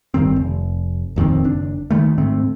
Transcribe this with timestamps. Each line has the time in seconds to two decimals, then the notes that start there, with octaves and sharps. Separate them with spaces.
0.14 G1 G2 D#3 C4
0.36 F1
1.16 D#1 F2 D#3 C4
1.44 F#1 D4
1.91 D2 D#3 G3 A3
2.18 D2 G#2 A3 C4